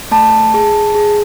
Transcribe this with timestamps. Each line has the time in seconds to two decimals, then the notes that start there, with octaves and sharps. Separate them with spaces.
0.11 A3 A5
0.54 G#4
0.95 G#4